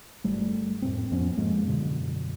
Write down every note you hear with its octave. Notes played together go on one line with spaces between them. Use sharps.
G1 G3 A3
F2 A2 C4
F2 F3 B3 C#4
G#2 F3 G#3 A#3
F#2 B2 D3